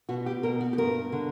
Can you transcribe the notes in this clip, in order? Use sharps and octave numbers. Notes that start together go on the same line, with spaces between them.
B2 F#4
G4
B2 A#4
F#4
G4
G2 A#4
D3